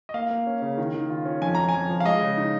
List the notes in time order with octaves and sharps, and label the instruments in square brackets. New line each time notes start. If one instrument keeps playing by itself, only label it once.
[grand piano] D#5
A#3 F5
A#3
C#4
C#3
D#3
D#3
F4
C#4
F2 G#5
F2 A#5
F2 G#5
F3
F5
G#3 D#5
C#3
D#4